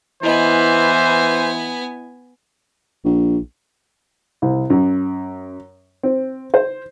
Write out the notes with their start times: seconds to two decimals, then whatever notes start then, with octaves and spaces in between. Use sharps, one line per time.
0.23 E3 B3 E4 C5 D#5 G#5
3.05 A#1
4.42 C2
4.70 F#2
6.03 C4
6.54 C5